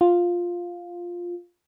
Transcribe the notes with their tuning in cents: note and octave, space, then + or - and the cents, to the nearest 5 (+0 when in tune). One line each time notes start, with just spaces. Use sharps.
F4 +5